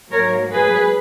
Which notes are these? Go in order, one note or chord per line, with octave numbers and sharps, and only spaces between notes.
G#2 F#3 A#3 A#4 C#5
G#4 B4